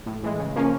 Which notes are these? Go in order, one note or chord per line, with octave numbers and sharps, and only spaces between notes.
A2
E3 G#3
C#3
F3 A#3 C#4